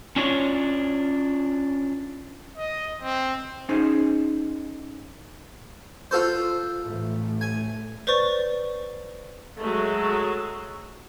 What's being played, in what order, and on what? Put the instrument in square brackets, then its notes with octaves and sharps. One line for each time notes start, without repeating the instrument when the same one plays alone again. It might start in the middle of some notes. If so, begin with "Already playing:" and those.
[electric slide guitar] C#4 D4 F4 C#5
[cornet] D#5
C4
[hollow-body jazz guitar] C#4 D#4 G#4 C5
[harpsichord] F4 A4 C5
[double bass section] A1 A3
[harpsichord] G#5
[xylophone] B4 C5 D5 C#6 A6
[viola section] F#3 G#3 A3